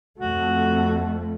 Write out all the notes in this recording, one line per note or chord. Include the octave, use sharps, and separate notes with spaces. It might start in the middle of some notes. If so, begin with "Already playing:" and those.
F2 A3 F#4